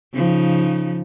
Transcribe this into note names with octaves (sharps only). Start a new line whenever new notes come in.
C#3 F3 D#4